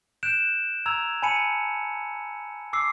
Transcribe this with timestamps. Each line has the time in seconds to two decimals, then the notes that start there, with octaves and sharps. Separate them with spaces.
0.23 F#6 G6 D7 E7
0.86 A#5 E6 G#6 F7
1.22 G#5 A5 B5 C#7 D#7
2.73 D6 E6 C7